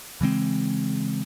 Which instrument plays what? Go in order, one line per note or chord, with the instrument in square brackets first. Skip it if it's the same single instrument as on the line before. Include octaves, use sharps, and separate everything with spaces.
[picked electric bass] C#3 E3 G#3 C4